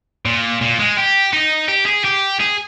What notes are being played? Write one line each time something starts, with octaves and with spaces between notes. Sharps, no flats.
A#2
A#2
G#3
G4
D#4
G4
G#4
G4
G#4